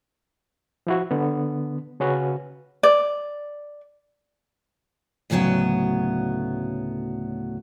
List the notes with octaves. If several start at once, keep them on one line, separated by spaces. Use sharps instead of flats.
F3 E4 F#4
D3 B3
C#3 C#4 F#4 B4
D5
D2 A2 C#3 F#3 B3 G5